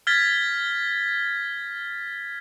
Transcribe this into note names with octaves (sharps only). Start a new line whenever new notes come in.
F6 G#6 A6 B6 G7